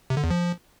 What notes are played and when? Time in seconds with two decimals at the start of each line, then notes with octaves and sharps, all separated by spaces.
0.10 C3
0.17 D3
0.24 E2
0.30 F3